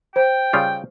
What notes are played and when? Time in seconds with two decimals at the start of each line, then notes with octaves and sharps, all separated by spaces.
0.16 C5 G5
0.53 C#3 G3 F4